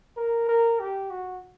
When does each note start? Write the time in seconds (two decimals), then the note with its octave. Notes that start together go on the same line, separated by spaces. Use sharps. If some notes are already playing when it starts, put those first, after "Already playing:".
0.17 A#4
0.49 A#4
0.79 G4
1.10 F#4